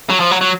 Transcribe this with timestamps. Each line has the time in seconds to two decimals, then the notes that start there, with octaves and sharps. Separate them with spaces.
0.10 F#3
0.20 F3
0.31 F#3
0.41 F#3